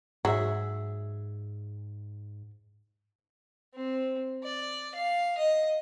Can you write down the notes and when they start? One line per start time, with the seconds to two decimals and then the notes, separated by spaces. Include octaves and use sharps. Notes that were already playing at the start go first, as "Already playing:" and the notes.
0.25 G#2 F#3 G#4 E5
3.75 C4
4.44 D5
4.95 F5
5.38 D#5